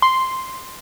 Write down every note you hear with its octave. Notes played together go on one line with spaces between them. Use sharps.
C6